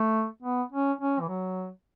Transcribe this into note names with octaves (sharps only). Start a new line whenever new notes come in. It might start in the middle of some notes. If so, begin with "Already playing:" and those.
Already playing: A3
B3
C#4
C#4
E3
F#3